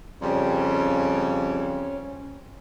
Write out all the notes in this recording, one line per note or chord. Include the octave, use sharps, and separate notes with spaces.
F2 C#3 G3 C#4